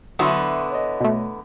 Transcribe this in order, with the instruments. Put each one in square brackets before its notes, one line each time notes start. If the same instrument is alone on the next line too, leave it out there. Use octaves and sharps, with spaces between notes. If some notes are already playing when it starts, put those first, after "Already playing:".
[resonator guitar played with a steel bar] D3 B3 E4 [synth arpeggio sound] F#3 E5 [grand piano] C6 C#6 D#6
[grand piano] C#5 D#5
[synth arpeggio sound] B2 A3